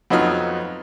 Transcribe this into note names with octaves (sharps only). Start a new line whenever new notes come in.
F2 F#3 B3 D#4 F4 F6